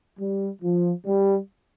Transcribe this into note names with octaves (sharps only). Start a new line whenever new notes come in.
G3
F3
G3